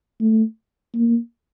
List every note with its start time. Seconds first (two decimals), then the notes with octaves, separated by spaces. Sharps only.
0.20 A3
0.94 A#3